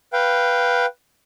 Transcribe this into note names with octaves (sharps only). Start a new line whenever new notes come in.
B4 F5 G5